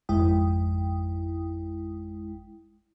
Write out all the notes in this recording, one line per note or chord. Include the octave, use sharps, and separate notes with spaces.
G#1 F2 G#3 E4 G5 D#6